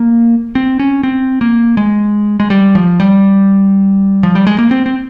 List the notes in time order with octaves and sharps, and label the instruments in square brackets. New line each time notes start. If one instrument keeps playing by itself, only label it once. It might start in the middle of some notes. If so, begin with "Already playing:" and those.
Already playing: [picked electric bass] A#3
C4
C#4
C4
A#3
G#3
G#3
G3
F3
G3
F3
G3
G#3
A#3
C4
C4